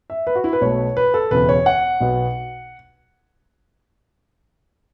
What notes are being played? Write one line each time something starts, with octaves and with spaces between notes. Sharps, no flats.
E5
B4
F#4
E4
B4
B1 B2 A3 C#5
B4
A4
E1 E2 C#3 B4
C#5
F#5
B1 B2 B3